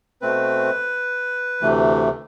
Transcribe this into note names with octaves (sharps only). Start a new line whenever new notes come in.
B2 A3 C4 B4
D2 C3 E3 A3